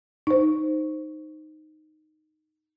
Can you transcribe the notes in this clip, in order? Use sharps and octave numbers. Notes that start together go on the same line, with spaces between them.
D#4 C5